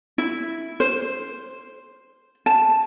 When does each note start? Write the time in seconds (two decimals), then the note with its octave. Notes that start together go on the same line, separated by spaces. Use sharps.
0.18 E4
0.80 C5
2.46 A5